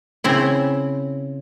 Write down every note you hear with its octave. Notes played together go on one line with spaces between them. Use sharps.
C#3 C4 E4